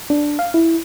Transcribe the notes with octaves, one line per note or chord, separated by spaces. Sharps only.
D4
F5
E4